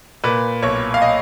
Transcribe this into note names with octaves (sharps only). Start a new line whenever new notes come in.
A#2 B4
B1 C#5
F5
D#5